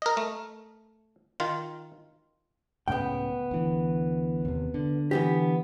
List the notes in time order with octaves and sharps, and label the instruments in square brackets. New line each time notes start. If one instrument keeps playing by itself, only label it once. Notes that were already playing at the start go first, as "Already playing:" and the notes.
[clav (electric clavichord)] A#4 D#5
A3
D#3 F4
[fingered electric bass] C#2 A2 C#3 [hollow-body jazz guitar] B3 G5
[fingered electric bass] D2 E3
D#2 C3
D3
[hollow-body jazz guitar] E3 B3 G4